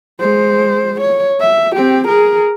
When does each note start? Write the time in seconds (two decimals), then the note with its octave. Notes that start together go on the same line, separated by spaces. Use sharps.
0.20 G#3 C5
1.00 C#5
1.40 E5
1.75 C4 G4
2.07 G#4 A#4